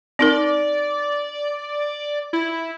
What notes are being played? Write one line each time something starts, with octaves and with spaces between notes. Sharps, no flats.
C4 D#4 A#4 D5
E4